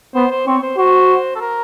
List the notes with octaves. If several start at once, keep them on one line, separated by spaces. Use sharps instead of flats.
B3 C5
C5
C4 C#5
C5
F#4 C5
A4
A#4